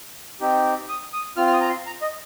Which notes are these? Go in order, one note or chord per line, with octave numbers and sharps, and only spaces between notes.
C4 D#4 G4
D#6
D#6
C4 F4 F6
F6
D#6
A#5
C6
A#5
D#5